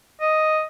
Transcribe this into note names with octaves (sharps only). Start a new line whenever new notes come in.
D#5